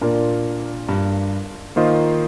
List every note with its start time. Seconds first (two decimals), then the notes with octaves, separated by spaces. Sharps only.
0.01 A#2 A#3 D4 F4 A#4 D5
0.89 G2
1.76 D#3 A#3 F4 C5 D#5